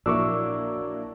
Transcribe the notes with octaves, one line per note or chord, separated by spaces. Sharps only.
A#1 F#3 A#3 D4 E4 C#6 D6 E6